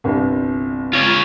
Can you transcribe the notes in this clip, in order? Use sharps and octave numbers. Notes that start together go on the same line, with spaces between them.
G1 C2
F4 C#5